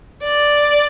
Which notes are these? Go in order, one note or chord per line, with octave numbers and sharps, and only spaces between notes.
D5